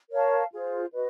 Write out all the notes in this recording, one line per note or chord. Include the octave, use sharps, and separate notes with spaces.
A#4 C#5 F5 A5
F4 G#4 C5
F#4 B4 D#5